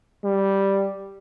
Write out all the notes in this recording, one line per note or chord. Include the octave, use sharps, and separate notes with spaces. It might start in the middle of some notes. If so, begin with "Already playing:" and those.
G3